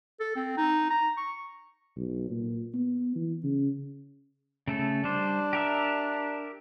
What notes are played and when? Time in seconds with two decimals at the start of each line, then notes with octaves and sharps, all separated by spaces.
0.20 A4
0.36 C4
0.57 D#4
0.90 A#5
1.17 C#6
1.96 B1
2.30 A#2
2.74 B3
3.16 E3
3.44 C#3
4.67 C#3 A3 A4
5.04 G3 D4 C5
5.53 G4 A#4 E5